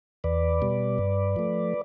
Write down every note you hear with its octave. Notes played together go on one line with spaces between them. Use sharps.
E2 B4 D5
B2 G3
G2
F3 A3